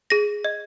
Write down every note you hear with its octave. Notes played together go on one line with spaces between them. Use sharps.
G#4 A#6
D#5